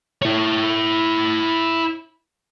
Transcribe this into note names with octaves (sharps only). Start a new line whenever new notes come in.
E4 C#5